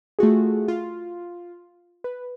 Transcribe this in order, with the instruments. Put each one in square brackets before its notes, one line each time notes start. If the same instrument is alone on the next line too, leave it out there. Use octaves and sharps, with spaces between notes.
[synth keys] A3 F4 F#4 G#4
F4
B4